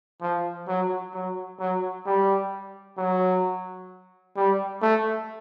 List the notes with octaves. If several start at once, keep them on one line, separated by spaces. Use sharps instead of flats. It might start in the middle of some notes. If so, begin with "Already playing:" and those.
F3
F#3
F#3
F#3
G3
F#3
G3
A3